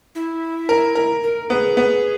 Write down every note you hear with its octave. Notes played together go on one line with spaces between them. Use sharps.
E4
A#4
A#4
A#4
B3 G#4
B3